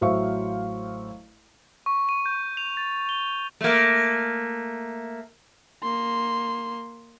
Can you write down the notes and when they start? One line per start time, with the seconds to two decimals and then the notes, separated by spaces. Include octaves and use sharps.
0.01 A1 F#3 C5 E5 F5 C#6
1.86 C#6
2.09 D#7
2.26 G6
2.57 F7
2.77 A6
3.09 G7
3.61 A3 A#3
5.83 A#3 C6